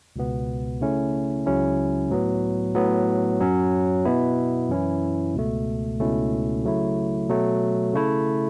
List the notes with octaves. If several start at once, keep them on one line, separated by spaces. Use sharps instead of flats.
C#2 B2 B3
C#3 A3 C#4 E4
C#2 C#3 F#3 C#4 E4
A2 F#3 B3
A2 F#3 B3
F#2 F#3 C#4
B2 B3 E4
F#2 E3 C#4 E4
C#2 B2 A3
C#2 B2 A3 C#4 E4
C#3 F#3 A3 E4
B2 F#3 A3
C#3 A3 E4